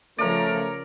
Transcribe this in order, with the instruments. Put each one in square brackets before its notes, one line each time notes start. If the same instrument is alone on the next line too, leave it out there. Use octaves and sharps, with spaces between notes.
[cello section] C#3 F3 [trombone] A3 [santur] A#4 D5 [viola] C#5 A#5